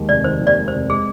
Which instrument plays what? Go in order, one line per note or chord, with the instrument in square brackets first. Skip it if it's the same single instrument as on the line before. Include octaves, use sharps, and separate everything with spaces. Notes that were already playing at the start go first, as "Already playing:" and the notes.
Already playing: [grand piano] D#2 D#3 G#3
[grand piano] F1 [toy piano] D5
[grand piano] D#3 [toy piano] C5
[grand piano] D#2
[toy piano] D5
[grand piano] G#3
[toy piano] C5
[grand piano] F1
[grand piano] G#3 [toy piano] G#4